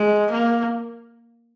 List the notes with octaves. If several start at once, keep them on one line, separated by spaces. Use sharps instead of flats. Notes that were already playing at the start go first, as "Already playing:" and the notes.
Already playing: G#3
A#3